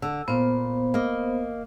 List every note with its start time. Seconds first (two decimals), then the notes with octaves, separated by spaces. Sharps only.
0.02 D3 E6
0.28 A#2 B3 F4 C5
0.94 A#3 D#5